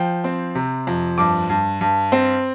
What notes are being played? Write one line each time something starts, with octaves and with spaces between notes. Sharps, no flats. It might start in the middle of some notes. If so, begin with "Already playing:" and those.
Already playing: F3 G5
C4
C3
F2
G2 D6
G2
G2
C4